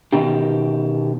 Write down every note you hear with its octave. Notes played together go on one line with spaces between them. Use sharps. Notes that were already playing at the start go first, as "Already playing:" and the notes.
B2 D#3 G4